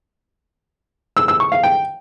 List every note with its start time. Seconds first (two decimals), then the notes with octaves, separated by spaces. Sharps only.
1.17 E6
1.28 E6
1.40 C#6
1.52 F5
1.64 G5